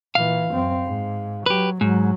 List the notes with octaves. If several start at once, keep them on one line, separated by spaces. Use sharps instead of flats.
A#2 E3 F5
F#2 C4
G#2
F#3 G4 B4
G#2 F#3